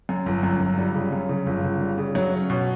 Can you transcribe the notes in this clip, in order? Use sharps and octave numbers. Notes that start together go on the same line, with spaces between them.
F#2
G1
F#2
G1
G3
C#3
F#2
C#3
G1
C#3
G3
C#3
F#3
C#4
B2